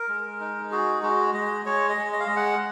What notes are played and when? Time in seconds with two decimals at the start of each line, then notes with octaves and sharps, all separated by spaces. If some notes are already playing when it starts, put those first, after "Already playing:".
Already playing: A#4
0.09 G#3
0.40 D#4
0.72 F#4 G#4
1.03 G#3 F#4
1.34 G#3 D#5
1.66 G#3 C#5
1.89 D#5
1.97 G#3
2.13 D#5
2.20 F5
2.27 G#3 D#5
2.36 F#5